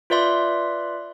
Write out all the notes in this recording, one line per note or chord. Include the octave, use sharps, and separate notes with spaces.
F4 B4 D5 E5 C6